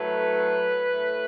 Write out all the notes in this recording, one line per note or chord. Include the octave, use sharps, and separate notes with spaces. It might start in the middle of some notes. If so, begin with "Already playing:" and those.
Already playing: A2 F#3 A3 B4
A2 A3